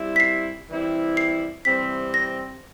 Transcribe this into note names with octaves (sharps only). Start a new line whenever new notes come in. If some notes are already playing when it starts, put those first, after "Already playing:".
Already playing: G3 C4 E4
B6
C7
E3 G3 C4 E4
C7
C3 E3 G3 C4 B6
A#6